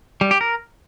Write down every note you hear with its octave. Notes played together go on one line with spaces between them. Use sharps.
G3
G4
A#4